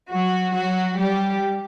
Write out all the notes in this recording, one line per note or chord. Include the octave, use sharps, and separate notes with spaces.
F#3 F#4
F#3 F#4
G3 G4